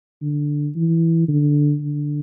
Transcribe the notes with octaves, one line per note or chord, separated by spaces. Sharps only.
D3
E3
D3
D3